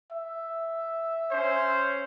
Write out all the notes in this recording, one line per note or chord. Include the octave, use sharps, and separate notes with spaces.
E5
C#4 C5